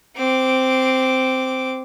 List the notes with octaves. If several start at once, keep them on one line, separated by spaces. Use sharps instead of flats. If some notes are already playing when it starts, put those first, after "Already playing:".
C4 D6